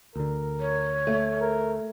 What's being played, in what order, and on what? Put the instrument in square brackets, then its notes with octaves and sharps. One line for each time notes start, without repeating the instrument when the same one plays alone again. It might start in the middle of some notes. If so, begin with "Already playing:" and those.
[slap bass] D2 D3 [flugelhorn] A#4
[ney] C#5
[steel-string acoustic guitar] A3
[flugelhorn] A#4